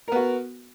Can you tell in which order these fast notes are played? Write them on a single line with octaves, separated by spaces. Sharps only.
A#4 B3 F#4